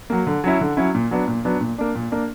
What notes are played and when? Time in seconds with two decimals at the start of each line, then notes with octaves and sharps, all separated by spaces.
0.10 F#3 A#3
0.27 D3
0.44 F#3 C#4 E4
0.61 D3
0.77 F#3 C#4 E4
0.95 A#2
1.11 F#3 B3 D4
1.28 A#2
1.45 F#3 B3 D4
1.61 A#2
1.78 A#3 D4
1.95 A#2
2.12 A#3 D4